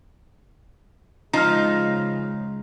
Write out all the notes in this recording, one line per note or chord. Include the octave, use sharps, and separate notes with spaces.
C#3 F3 G#3 D#4 F4 A#5 F6